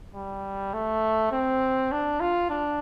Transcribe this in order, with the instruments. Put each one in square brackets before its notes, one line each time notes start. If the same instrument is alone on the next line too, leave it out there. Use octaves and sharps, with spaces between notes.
[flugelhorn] G3
A3
C4
D4
F4
D4